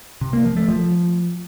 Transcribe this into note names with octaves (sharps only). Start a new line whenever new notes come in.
C3
A#3
F3
A3
F3